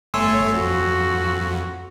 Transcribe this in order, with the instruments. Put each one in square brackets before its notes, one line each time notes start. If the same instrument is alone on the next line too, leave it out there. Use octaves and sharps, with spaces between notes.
[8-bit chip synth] G1 A3 C#5 [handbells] G#5 C6 E6
[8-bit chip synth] F2 [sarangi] F#4